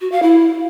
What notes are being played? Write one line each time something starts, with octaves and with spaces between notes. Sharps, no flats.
F#4
F5
E4